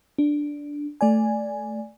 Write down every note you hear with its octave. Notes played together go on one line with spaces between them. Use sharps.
D4
A3 D5 G#5